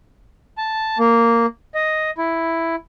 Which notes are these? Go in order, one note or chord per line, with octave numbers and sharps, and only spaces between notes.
A5
A#3
D#5
E4